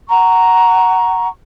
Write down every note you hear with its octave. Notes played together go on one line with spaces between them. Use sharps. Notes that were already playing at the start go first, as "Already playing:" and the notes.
F#5 A#5 C#6